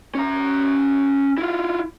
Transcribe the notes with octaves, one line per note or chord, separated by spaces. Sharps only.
C#4 A#5
E4 F4